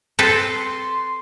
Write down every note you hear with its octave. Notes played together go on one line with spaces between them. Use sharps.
C4 A4 B4 C6